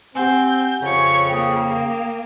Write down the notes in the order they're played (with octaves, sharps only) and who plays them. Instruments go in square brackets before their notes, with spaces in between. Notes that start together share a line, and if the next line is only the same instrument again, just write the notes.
[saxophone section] C4 [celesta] G4 F#5 G#5 [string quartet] G6
[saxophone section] F2 C#3 [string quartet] C#5 C#6
[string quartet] A#3 [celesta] G5 D#6